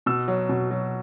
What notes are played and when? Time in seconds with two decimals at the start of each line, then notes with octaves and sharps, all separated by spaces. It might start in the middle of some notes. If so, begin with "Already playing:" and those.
0.06 B2 E6
0.28 F#3
0.49 B2
0.71 F#3